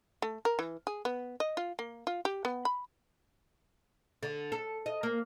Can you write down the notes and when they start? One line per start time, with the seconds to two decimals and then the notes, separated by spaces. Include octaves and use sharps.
0.22 A3
0.45 A#4
0.59 E3
0.87 G#4
1.05 B3
1.40 D#5
1.57 F4
1.79 A#3
2.07 F4
2.25 G4
2.45 B3
2.65 B5
4.23 D3
4.52 A4
4.86 D#5
5.03 A#3